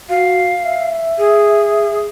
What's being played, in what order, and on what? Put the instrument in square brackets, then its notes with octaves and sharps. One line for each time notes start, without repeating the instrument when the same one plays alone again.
[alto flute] F#4 [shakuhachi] F5
[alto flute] E5
[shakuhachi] G#4